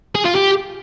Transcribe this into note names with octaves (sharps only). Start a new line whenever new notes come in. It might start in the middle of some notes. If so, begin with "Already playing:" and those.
G#4
F4
G4